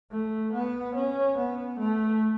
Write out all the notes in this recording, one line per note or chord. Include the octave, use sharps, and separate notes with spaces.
A3
B3
C#4
B3
A3